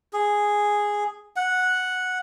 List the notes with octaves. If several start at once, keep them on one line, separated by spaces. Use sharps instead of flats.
G#4
F#5